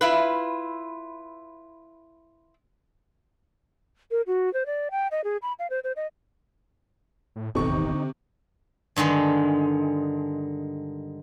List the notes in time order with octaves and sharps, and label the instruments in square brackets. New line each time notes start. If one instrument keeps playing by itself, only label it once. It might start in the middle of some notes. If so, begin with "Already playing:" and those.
[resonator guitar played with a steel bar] E4 F4 B4
[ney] A#4
F#4
C5
D5
G5
D#5
G#4
B5
F5
C5
C5
D#5
[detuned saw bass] A2
[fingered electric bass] D#1 G#1 E2 [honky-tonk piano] C3 C#6 [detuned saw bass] D#4 [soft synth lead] A4
[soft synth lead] D#3
D3
[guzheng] G2 D3 D#3 G#3